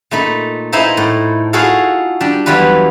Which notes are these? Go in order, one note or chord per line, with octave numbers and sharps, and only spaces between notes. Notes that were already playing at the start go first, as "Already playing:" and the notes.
A#2 A3 D#4 B5
A#3 D#4 E4 C5 E5 G#5
A2
F4 F#4 G#4 A4 C#5 F5
G3 D4
E2 F#3 G3 F4 B4